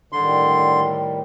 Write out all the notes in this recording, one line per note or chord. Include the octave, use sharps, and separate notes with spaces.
A2 D3 D#3 G3 C6